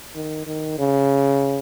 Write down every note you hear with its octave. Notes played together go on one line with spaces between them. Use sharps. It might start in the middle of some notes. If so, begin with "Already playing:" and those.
D#3
D#3
C#3